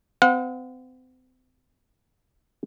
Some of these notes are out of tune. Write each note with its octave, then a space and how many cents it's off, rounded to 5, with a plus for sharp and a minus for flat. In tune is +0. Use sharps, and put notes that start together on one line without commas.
C4 -40 F#5 -45